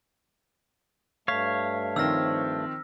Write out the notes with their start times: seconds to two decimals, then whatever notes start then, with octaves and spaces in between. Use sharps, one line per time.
1.28 G2 A3 C#5 F5 B6
1.96 D#3 F3 C4 E6 F6 A#6